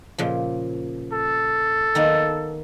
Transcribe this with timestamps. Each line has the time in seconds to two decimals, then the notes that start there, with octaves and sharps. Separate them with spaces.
0.18 A#2 C#3 F3
1.12 A4
1.95 D#3 A#3 B3